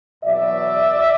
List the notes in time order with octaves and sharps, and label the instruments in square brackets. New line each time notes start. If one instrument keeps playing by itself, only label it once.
[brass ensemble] E2 B2 F#3 D5 E5